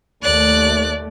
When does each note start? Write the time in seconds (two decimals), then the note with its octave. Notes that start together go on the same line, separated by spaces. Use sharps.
0.22 D#2 A3 D5 F#6